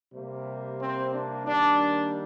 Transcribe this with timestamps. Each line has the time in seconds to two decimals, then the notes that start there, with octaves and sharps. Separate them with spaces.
0.13 C3 G3 A#3
0.80 C4
1.13 D4
1.45 D#3 G3 A#3 D4